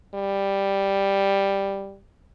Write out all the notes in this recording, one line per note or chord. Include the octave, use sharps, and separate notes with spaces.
G3